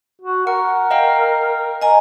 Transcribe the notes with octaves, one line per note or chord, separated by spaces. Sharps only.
F#4
A#4 F#5
D#5 F5 G5
D#5 G#5 A#5